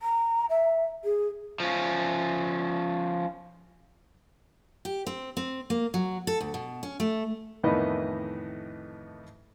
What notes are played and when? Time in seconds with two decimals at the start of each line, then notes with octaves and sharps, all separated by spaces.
0.02 A#5
0.50 E5
1.04 G#4
1.60 F3 C#4
4.85 G4
5.07 C4
5.37 C4
5.70 A#3
5.94 F#3
6.27 A4
6.41 D2
6.54 B2
6.83 C#4
7.00 A3
7.63 F2 A2 D#3 E3 B3 D#5